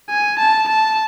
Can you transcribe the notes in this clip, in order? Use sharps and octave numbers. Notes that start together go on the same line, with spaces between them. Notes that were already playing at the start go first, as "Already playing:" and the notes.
G#5
A5
A5